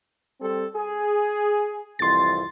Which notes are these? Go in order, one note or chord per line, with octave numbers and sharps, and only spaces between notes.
G3 C4 A4
G#4
C2 F2 E3 C6 A6